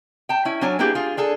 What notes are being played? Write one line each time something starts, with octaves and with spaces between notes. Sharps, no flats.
G5 A5
C#4 E4
F#3 C#4 D4 C#5 G#5
A#3 B3 D4 E4 G4 G#4
F4 G#4
D4 G#4 A4